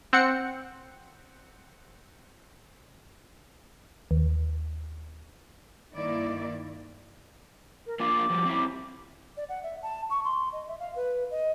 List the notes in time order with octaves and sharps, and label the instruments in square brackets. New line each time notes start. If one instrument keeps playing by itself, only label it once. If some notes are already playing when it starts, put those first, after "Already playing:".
[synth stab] C4 F#5 C#7
[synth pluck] D#2
[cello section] G2 D#3 A#3 E4 D5
[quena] A#4
[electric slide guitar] A#3 D4 F4 [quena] D6
[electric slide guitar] F3 G3
C4 C#4 E4
[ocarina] D5
F#5
E5
A5
C#6
C6
D#5
E5
F5
B4
D#5